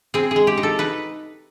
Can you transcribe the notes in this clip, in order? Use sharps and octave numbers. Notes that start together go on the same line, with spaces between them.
C4 G#4
G#4
G#3
G4
D#4
A4
D#4 B4